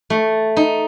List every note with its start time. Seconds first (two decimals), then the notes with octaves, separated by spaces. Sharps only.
0.10 A3
0.56 D#4